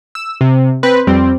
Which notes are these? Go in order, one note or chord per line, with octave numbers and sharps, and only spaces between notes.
E6
C3
C4 B4
F2 G3 C4